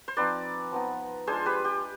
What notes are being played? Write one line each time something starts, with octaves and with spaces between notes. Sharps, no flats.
C5
F3 C4 D#4 B4 D5
F3 B3 D#4
G#3 D4 F4 G#4 C5
G4 B4
G4